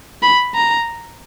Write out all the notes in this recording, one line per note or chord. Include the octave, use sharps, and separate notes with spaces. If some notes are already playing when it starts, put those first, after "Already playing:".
B5
A#5